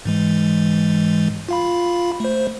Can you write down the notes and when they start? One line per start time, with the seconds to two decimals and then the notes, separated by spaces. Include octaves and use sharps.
0.05 G#2 E3 G#3
1.49 F4 F5 B5
2.20 A3 C5